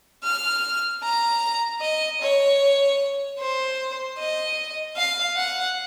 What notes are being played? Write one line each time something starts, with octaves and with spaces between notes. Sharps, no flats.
F6
A#5
D#5
C#5
C5
D#5
F5
F#5